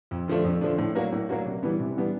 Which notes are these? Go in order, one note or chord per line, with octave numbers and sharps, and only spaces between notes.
F2
D3 F3 A3 D4
F2
D3 F3 A3 D4
A2
F#3 A#3 D4 F#4
A2
F#3 A#3 D4 F#4
C3
E3 G3 B3 D4
C3
E3 G3 B3 D4